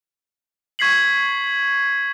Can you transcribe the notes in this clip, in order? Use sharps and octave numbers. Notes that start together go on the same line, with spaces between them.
C#6 G#6 B6 C7 F#7